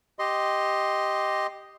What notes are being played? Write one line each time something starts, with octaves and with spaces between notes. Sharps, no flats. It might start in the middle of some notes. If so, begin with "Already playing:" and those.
G4 D#5 C6